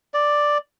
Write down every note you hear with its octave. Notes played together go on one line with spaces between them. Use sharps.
D5